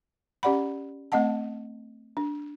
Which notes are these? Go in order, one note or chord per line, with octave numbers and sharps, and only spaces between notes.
C#4 G4 D5 F#5 B5
A3 C4 D#5 F#5 A5
D4